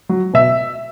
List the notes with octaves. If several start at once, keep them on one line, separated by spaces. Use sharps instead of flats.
F#3
B2 E5